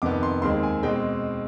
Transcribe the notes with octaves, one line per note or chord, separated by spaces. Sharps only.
F2 C3 D#3 B3 D6
C6
D#2 D#3 G#3 C4 C6
G#5
B2 G#3 C4 G5